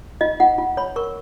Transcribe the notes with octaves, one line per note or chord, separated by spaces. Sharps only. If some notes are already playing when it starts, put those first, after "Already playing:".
F4 D#5
F4 F#5
F4
C#5 B5
A#4 C#6